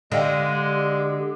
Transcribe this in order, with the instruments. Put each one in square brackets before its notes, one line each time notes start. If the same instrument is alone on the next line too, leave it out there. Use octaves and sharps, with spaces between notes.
[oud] D3 [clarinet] G#3 [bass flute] G4 [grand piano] D#5 F5 G5